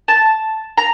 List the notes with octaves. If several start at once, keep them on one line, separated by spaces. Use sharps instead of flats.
A5
A#5